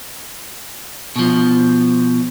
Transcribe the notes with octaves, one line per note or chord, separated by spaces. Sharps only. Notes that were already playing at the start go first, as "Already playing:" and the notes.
B2 F3